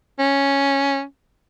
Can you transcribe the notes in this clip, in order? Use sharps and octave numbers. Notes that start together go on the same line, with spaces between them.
C#4